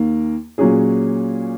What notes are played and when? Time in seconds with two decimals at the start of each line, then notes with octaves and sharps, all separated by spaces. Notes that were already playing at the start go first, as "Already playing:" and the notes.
Already playing: D#2 D#3 A#3
0.58 A#2 F#3 C#4 G#4